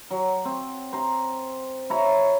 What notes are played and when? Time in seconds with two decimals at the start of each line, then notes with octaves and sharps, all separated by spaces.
0.10 F#3
0.45 C4
0.93 C5 A#5
1.90 E4 C#5 A#5